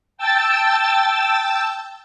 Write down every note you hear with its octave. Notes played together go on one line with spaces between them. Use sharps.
G5 A5 E6 A6